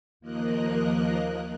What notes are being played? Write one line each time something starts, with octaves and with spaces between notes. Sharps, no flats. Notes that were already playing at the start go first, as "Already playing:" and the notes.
D#2 F3 A#3 A#4 D#5 F#6